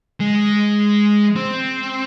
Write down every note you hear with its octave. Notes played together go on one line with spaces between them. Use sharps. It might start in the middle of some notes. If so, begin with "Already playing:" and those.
G#3
C4